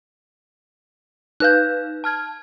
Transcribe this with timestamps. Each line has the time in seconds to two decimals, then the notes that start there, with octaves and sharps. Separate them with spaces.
1.40 D#4 B4 F5 F#6 G6
2.04 A5 F6 G#6